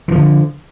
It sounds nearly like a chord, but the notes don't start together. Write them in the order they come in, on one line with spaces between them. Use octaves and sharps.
E3 F3 D3